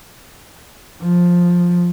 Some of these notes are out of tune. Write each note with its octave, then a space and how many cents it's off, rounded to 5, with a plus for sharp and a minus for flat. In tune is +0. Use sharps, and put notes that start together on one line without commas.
F3 +10